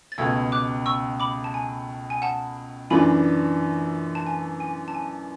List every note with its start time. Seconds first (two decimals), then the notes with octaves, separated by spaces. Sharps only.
0.12 A6
0.18 C#2 B2 A3 E6 G#6
0.52 D6 F#6
0.86 C#6 E6
1.20 B5 D6
1.44 A5
1.54 G#5
2.10 G#5
2.22 F#5 A5
2.90 F#2 E3 A3 D4 G#5 B5
4.15 A5
4.26 G#5
4.60 G#5
4.88 A5
4.95 G#5